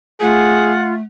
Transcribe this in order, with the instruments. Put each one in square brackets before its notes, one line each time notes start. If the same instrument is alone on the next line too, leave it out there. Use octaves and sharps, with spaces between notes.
[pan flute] A3 [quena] F4 [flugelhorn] G#4 [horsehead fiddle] F#5